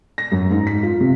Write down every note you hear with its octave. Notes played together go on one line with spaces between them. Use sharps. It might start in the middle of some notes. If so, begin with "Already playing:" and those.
A#6
F#2
G#2
B6
F4
C3